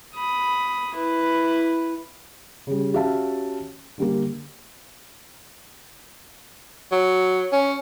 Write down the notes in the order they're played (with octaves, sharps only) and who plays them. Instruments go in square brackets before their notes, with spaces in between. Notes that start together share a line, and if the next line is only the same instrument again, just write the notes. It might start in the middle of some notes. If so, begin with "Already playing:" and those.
[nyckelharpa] B5 D#6
E4 B4
[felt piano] C#3 G3
C#4 F#4 G4 E5 F5 A5
D3 G3 A#3
[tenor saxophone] F#3
C#4